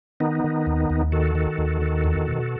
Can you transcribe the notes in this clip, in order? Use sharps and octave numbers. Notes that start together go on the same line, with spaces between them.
D#3 B3 D#4
D#3
D#2
D#2
D#3 F#4 A4
D#3
D#2
D#3
E2
B2